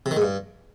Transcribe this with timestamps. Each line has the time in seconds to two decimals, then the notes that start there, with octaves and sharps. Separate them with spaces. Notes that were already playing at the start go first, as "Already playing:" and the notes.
0.06 C3
0.11 D#3
0.17 G#2
0.22 G2